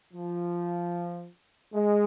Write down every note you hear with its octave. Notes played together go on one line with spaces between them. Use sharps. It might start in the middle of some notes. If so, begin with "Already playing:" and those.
F3
G#3